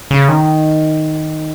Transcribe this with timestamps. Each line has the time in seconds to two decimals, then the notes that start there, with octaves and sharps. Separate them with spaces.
0.11 C#3
0.28 D#3